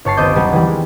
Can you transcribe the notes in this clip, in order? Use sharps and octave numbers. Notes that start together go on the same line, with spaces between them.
G1 C#5 A5 C7
D#1 B3 C4 D#5 D6 G6
F#3 G3
E3 G3
G#3